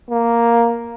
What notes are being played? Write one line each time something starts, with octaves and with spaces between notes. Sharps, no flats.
A#3